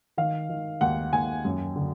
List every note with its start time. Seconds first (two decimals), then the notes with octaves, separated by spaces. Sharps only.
0.17 D#3 F5
0.49 D#3
0.81 D#2 F#5
1.13 D#2 G#5
1.45 F#2
1.76 D3